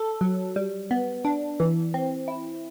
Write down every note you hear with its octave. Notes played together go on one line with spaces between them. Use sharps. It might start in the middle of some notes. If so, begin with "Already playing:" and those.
Already playing: A4
F#3
G3
B3
D4
E3
C4
E4